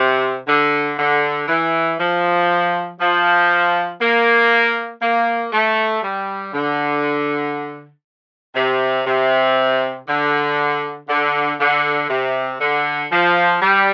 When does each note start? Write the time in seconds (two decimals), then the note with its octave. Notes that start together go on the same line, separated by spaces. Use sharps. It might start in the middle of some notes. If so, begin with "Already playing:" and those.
Already playing: C3
0.47 D3
0.98 D3
1.48 E3
1.99 F3
3.00 F3
4.00 A#3
5.02 A#3
5.52 A3
6.03 G3
6.53 D3
8.55 C3
9.06 C3
10.07 D3
11.08 D3
11.59 D3
12.09 C3
12.59 D3
13.11 F3
13.61 G3